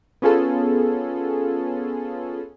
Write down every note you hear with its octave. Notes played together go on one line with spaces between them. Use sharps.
B3 C#4 F4 G#4 A4